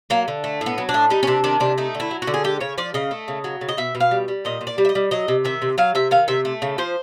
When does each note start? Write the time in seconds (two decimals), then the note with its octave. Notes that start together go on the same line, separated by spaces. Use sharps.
0.10 F#3 A#3
0.28 D3
0.44 A3
0.61 A2
0.66 B3
0.78 F#3
0.89 D4
0.94 A2
1.10 G3 D#4
1.23 C#4
1.27 C3 D4
1.44 D#3 D4
1.60 C3 D4
1.78 A3 D#4
1.95 D3
2.00 E4
2.11 F#3
2.22 F#4
2.27 D3
2.34 G#4
2.44 G#3 G4
2.60 C#3 C#5
2.78 F3 D5
2.94 C#3 D#5
3.11 A3
3.28 C#3
3.44 F#3
3.61 C#3
3.69 D#5
3.77 B2 E5
3.95 B2
4.00 F5
4.11 G3
4.28 G3
4.45 A#2 D#5
4.61 A#2
4.67 D5
4.78 G3
4.85 E5
4.89 D#5
4.95 G3
5.11 F#3 D#5
5.28 C3
5.45 D#3 E5
5.62 C3
5.78 F#3 F5
5.95 C3 E5
6.11 D#3 F5
6.28 C3 E5
6.45 A3
6.62 C#3
6.78 F3 C5